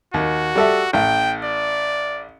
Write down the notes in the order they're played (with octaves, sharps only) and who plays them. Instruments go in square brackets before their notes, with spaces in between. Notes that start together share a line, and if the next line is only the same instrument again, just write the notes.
[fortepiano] D#2 [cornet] F#4
[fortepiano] G3 A4 E5
[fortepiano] A1 [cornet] G5
[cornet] D5